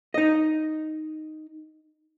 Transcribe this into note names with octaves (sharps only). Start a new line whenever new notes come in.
D#4 D#5